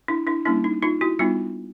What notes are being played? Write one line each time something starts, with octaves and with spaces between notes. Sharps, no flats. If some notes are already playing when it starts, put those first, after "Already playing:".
D4 E4
D4 E4
G3 A#3 C#4 D4 E4
D#4
D#4 F4
E4 F#4
G3 B3 D4 D#4 F4